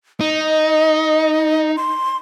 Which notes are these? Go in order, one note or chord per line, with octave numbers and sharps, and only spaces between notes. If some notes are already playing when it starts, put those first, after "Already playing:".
D#4 D#5
C6